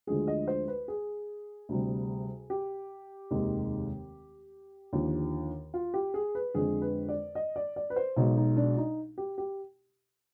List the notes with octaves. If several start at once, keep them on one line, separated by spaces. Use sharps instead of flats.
D2 D3 F3 G#3 G#4
D#5
C5
B4
G#4
D2 C3 G3
G4
F1 D#2 D#3 G#3
D#2 D3 F3
F4
G4
G#4
B4
F2 D3 G#3 G#4
B4
D5
D#5
D5
D5
B4
C5
B1 B2 G#3 D#4
D#4
D4
D#4
G4
G4